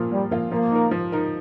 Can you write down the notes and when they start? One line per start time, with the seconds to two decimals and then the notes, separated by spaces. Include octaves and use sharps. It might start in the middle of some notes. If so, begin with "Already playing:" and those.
Already playing: A#2 F3 A#3 F4
0.11 A#2 G3
0.31 F3 A#3 F4
0.51 F3 A#3
0.71 D#4 A#4
0.91 F3
1.12 D#4 A#4